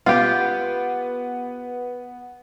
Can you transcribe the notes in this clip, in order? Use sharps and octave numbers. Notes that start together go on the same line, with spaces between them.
B3 F4 G4